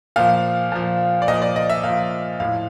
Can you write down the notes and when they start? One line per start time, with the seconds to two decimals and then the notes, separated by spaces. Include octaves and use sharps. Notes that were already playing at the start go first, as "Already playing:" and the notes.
0.16 A#2 F3 F5
0.72 A#2 F3
1.22 D5
1.28 A#2 F3 D#5
1.42 D5
1.56 D#5
1.70 E5
1.83 A#2 F3 F5
2.40 A2 F3 F5